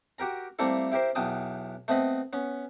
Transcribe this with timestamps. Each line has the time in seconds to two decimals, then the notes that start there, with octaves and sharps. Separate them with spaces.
0.18 F#4 G4 A#4 A#5
0.59 G3 A3 A#3 C4 E4 A4
0.92 E4 G4 A#4 C5
1.15 B1 E2 B3 G5 A5 D#6
1.88 A3 B3 C4 D#5 B5
2.33 B3 C#4